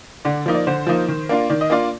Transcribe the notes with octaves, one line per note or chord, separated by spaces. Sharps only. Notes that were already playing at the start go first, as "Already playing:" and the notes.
D3 D5
F3 A#3 D#4
D5
D3 C5
F3 A#3 D#4
D#3
A#3 D4 F4
D#3 D5
D#5
A#3 D4 F4 D5